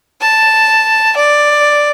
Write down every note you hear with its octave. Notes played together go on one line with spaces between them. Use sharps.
A5
D5